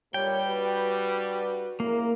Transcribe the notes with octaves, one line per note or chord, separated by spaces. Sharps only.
G2 A#2 G3 C#5 G5
G2 F#4 B4
C#3 A#3 E4 A#4